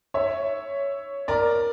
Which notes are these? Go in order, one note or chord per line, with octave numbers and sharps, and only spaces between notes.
C#5 E5
A#4 D5